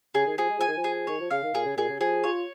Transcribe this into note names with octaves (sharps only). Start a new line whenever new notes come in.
C#3 G#4
D#3
F3 G#4
G#3
F3 G#5
D#3
F3
G#4
D#3 C#5
F3
C#3 F5
D#3
A#2 G#4
C#3
A#2 G#4
C#3
F3 G#4
F4 C#5